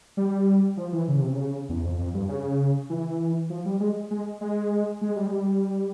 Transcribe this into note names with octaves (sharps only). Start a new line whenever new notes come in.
G3
F3
E3
C#3
C3
C#3
E2
F2
F2
G2
C#3
E3
F3
G3
G#3
G#3
G#3
G#3
G3
G#3
G3